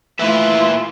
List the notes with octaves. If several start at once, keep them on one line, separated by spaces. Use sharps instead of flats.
A#2 A3 E4 F4 B4 E5